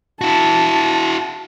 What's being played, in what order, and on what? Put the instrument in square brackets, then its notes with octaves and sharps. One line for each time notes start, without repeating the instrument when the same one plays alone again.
[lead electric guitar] E4 F#4 [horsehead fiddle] A5